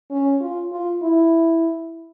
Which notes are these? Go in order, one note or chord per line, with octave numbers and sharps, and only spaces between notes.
C#4
F4
F4
E4